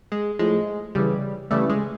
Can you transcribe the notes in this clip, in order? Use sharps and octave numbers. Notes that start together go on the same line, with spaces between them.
G#3
A2 F3 G#3
C#3 E3 G3
C#3 E3 G3 A3
G#3